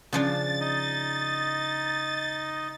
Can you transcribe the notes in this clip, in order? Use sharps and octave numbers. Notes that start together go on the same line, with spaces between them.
C#3 F3 D4 A6
D#4 D#5